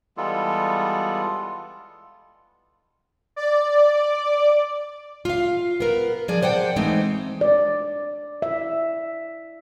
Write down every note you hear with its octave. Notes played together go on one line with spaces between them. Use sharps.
E3 G3 G#3 B3 F4 A4
D5
F4 F5
B3 A#4
F3 G#4 D5
C5 D5 F#5 G5
E3 G#3 A3 C4 D#4
D5
E5